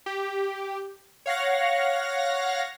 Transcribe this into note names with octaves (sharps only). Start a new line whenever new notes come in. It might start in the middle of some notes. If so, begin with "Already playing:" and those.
G4
C#5 F5 F#5 A#6